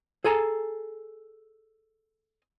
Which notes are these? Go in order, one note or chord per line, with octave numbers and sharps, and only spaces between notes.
G#4 A4 G#5 A#5